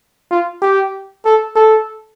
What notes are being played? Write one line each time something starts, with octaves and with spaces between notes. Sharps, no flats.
F4
G4
A4
A4